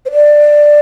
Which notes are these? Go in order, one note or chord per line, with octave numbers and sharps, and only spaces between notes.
C5
D5